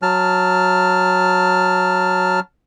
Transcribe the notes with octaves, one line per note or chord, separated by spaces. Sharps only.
F#3 A5 F6